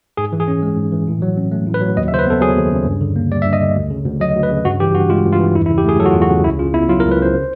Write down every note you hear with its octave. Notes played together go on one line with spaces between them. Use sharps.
G#2 G#4
E3
G#4
C#4
G#3
G#2
E3
A2
F#3
C#4
A3
A2
B4
F#3
D#2 D#5
E5
C#3 C5
B4
B3 A4
F#3 G#4
D#2
C#3
G2
D3
A#3
G3 D5
G2 E5
D#5
D3
D2
C#3
D2
F#3 D#5
D2
B4
C#3
G2 F#4
E3 G4
G2 F#4
G#3 F4
G2
F4
E3
E2 E4
E4
C#3
G4
A3 G#4
F#3 A4
F#4
F4
E2
F#4
C#3
C#2 E4
C#3 F4
B3 E4
F#3 F4
A#4
C#2
B4
C#3 C5